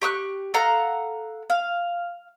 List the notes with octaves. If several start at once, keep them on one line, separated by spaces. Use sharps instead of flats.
G4 C#6 D#6 F#6
A4 F5 F#5 A#5
F5